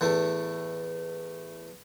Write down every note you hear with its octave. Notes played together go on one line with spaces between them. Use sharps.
E2 A2 A3